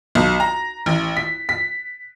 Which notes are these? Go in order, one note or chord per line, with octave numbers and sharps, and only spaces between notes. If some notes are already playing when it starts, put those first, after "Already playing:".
B1
A#5
A1
B6
B6